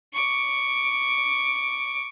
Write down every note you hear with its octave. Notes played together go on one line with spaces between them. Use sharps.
C#6 D6